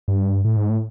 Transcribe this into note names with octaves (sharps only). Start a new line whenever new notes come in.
G2
A2
G#2
A2